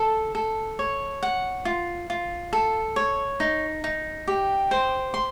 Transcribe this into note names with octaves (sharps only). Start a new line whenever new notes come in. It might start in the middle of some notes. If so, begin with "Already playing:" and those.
Already playing: A4
A4
C#5
F#5
F4
F4
A4
C#5
D#4
D#4
G4
C5
C6